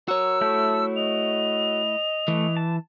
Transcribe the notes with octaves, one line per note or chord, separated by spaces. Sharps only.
F#4 A#4 C#5 E6
A3 E4 A4 G6
D#5 F7
E3 A3
A5